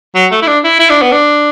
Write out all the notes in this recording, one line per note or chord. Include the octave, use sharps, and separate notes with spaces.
F#3
A3
E4
D4
E4
E4
D4
B3
D4